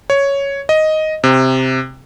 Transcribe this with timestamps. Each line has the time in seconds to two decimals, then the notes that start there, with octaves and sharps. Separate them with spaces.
0.10 C#5
0.69 D#5
1.24 C3